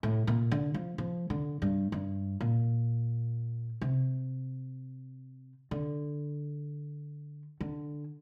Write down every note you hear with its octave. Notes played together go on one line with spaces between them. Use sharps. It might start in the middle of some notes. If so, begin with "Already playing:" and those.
A2
A#2
D3
F3
F3
D3
G2
G2
A#2
C3
D3
D3